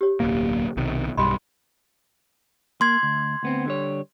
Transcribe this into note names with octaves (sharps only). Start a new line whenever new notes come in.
G4 C#5
D1 B1 A#3
B1 C3 D#3
B1 G2 G3 D#5 B5 C6
A#3 C6 G#6
D2
D2 B3 C4
D3 G3 C#5